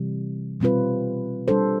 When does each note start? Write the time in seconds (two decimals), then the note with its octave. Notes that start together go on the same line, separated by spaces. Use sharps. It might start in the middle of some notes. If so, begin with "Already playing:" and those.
Already playing: C3 E3 G3
0.60 B2 G3 C4 F4 B4
1.48 G3 D4 A4 C5